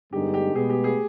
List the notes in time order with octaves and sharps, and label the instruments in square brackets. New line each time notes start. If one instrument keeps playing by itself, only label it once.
[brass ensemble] G2 D3 G#3 B3 D#4 [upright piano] G4
[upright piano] G4
[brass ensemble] B2 G#3 B3 [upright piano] G#4
[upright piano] G4
G#4